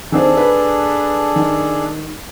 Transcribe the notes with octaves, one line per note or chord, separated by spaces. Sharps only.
D#3 C4 D4 G#4 A4 C5
B4
D#3